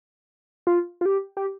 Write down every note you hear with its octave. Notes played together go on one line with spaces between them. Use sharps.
F4
F4
G4
G4